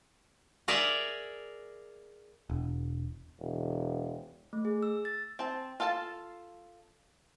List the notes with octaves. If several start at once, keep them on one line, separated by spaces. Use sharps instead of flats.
G#4 A#4 D5 E5
E1
E1
A3
G#4
E6
A6
C4 A5
F4 A4 F5 F#5 A5